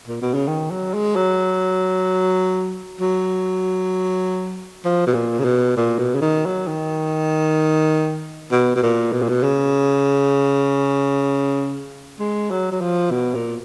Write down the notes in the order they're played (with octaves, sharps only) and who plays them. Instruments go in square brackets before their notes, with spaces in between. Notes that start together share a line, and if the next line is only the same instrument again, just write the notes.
[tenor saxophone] A#2
B2
C#3
D#3
F#3
G#3
F#3
F#3
F3
B2
A#2
C#3
B2
A#2
B2
C#3
D#3
F#3
D#3
B2
B2
A#2
B2
A#2
B2
C#3
G#3
F#3
F#3
F3
B2
A#2